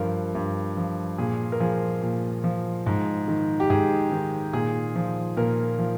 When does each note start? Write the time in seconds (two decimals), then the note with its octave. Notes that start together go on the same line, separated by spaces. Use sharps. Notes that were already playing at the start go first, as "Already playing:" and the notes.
Already playing: G2 F3 A#4
0.35 G2
0.77 F3
1.18 A#2 G#4
1.52 A#4
1.60 F3 G#4
2.02 A#2
2.44 F3
2.86 G#2
3.28 D#3
3.60 G4
3.70 G#2 G#4
4.12 D#3
4.53 A#2 G#4
4.95 F3
5.37 A#2 A#4
5.79 F3